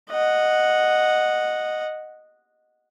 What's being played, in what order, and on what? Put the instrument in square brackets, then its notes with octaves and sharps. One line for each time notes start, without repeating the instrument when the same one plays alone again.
[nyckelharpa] D#5 F#5